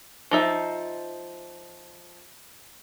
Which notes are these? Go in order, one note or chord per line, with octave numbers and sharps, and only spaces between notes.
F3 D#4 E5